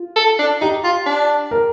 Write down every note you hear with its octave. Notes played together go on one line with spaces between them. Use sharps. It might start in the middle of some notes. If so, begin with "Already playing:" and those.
Already playing: F4
A4
D4
D#4 G4
F4
D4
A#4